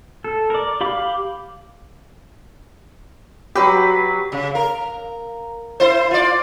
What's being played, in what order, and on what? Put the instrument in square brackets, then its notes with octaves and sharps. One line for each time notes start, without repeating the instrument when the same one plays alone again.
[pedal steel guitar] A4
A#4 D5
G4 F5 B5 D6
[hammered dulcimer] F#3 B4 [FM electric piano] G4
[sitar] C#3
A#4
E4 C5
F4 D5